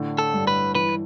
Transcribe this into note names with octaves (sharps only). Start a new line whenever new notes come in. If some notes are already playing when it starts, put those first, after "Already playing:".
Already playing: A2 D3
A4
G2
B4
E3 B4